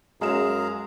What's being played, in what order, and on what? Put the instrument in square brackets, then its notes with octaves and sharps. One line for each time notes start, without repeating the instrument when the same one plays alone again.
[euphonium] F#2 [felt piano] G#3 E7 [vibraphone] F#4 [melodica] G#4 F5 A#5